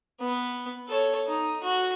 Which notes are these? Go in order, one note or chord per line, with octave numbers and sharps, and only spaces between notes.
B3
A4 C#5
D#4
F#4